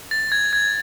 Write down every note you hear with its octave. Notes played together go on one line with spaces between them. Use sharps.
A6
G#6
G#6